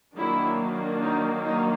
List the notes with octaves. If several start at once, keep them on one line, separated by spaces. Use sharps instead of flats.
D#3 F#3 A#3 D4 E4
D#4
D#4